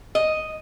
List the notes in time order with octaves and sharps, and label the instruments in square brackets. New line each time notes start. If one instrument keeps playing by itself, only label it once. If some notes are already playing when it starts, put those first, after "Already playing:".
[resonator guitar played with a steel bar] D#5